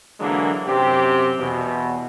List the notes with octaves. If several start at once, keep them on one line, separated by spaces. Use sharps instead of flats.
D3 E3 F#3 G#3 A#3 D4
F#2 C3 C4 G4
E2 B2